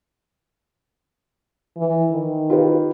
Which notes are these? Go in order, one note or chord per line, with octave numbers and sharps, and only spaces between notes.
E3
D#3
F4 G4 B4